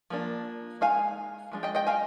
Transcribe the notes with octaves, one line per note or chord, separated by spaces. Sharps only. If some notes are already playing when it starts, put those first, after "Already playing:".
F3 A#3 D4
G#3 D#4 F5 G#5
F3 G#3 D4
D#5 G5
D#5 G5
F5 G#5